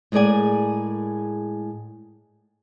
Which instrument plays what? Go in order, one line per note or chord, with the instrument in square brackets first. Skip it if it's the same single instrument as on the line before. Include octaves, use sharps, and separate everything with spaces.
[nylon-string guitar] A2 G#3 G#4 A#4 D5 G#5